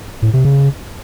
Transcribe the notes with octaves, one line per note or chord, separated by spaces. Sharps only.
A2
C3
C#3